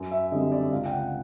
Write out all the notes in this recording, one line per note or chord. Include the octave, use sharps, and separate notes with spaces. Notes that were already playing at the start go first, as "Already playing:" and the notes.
Already playing: F#2
E5
D3 G3 C4 D#5
D5
C#2 F5
G5
F#5